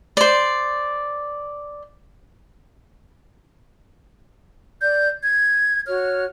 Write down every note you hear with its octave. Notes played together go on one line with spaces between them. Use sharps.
C5 D5
D5 G6
G#6
F#4 C#5 F6